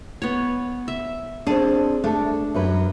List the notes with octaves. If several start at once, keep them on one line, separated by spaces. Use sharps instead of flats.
B3 C#5
E5
C4 D4 G#4 A4
A3 D4 A4
F#2 F#3 B4